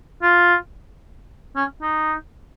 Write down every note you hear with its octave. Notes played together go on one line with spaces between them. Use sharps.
F4
C#4
D#4